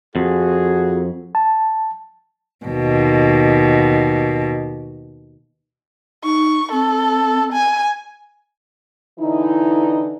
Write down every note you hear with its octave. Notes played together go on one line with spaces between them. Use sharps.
F2 F#4 G#4
A5
D#2 B2
D#4 C#6
C4 A4
G#5
D3 E3 D#4 E4